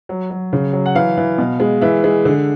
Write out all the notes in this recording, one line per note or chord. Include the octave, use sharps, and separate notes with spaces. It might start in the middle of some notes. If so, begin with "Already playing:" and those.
F#3
F#3
C#3
F#3
F#5
E3 F5
E3
B2
G#3
E3 E5
G#3
D3